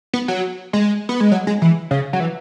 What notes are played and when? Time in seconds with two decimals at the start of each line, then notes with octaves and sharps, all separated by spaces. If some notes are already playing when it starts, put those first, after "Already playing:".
0.13 B3
0.28 F#3
0.73 G#3
1.09 B3
1.20 G#3
1.32 F#3
1.47 G#3
1.62 E3
1.91 C#3
2.13 F#3
2.20 E3